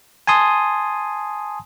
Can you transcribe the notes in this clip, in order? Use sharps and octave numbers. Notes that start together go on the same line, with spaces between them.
G#5 A5 C6 D#6